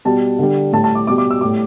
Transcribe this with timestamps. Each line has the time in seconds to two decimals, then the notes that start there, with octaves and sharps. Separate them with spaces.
0.05 B2 G3 A5
0.39 D3 G3
0.73 A2 G3 A5
0.84 A5
0.95 D6
1.07 B2 G3 D6
1.18 D6
1.31 E6
1.41 A2 G3 D6